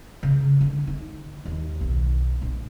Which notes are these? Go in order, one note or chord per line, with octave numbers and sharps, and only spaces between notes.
C#3
D3
D#4
D#2
B1
A#1